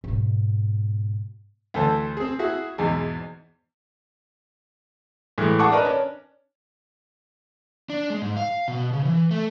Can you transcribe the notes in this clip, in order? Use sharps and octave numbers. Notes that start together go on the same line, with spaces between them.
G#2 B2
D2 E3 A4 C5 A5
C4 G#4
E4 F#4 G#4
E2 G#2 B2 E3 G#3
A2 E3 G#3
G#4 F#5 A5 C#6 D6
D4 A#4 B4 D#5
C#4 D4
D4
G#3
G#2
F5
B2
C#3
E3
A3